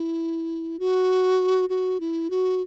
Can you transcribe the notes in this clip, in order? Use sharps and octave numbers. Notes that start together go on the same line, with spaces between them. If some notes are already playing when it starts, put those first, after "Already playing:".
Already playing: E4
F#4
F#4
E4
F#4